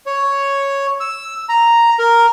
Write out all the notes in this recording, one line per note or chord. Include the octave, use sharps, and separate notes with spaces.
C#5
E6
A#5
A#4